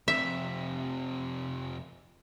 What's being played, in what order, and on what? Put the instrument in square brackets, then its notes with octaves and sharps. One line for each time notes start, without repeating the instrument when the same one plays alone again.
[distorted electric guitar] F2 C3 [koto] E5